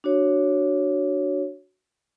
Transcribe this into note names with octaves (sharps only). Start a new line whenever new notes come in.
D4 F#4 C#5